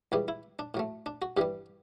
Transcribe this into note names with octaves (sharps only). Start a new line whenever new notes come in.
C#2 C#3 E3 G3 G4
E4
D4
A2 F#3 A3
D4
F#4
G2 E3 G3 G4